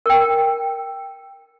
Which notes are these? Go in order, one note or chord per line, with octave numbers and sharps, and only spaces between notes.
A#4 G5